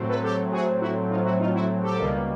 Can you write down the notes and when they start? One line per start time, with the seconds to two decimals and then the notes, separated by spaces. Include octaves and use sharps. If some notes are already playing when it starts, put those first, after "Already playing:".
Already playing: A2 F#3 A3 C4
0.09 A4 B4
0.23 G4 A4
0.52 F#4 G#4
0.82 E4 F#4
1.10 D#4 F4
1.25 E4 F#4
1.39 D#4 F4
1.54 E4 F#4
1.83 G4 A4
1.98 C#2 B2 G3 A#3